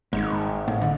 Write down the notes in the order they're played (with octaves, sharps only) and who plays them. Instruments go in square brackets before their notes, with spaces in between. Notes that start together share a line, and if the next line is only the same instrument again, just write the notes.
[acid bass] G#1 [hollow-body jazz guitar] G#2
[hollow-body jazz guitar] A2
D3